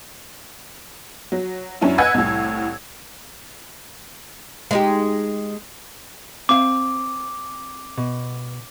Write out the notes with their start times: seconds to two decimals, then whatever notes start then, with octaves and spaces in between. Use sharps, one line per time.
1.32 F#3
1.81 F#2 C#4 D4 E4
1.98 B4 D#5 F#5 G#5 E6 G#6
2.14 C2 A2
4.71 G#3 D#4 G4
6.49 C4 F5 D6
7.98 B2